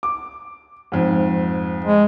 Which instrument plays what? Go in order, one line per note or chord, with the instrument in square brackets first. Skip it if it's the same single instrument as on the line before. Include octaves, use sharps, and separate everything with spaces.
[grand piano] D6
F2 G#2
[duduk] G#3